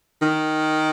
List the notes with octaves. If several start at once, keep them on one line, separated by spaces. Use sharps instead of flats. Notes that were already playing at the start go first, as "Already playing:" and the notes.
D#3